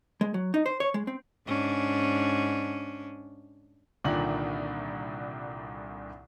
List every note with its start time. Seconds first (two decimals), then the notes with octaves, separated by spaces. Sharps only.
0.21 G#3
0.34 F#3
0.54 D#4
0.66 C5
0.80 C#5
0.94 G#3
1.07 C4
1.47 G#2 C#4 D4
4.04 C2 A#2 D3 D#3 F#7